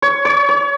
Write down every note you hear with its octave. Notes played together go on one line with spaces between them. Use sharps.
C#5
C#5
C#5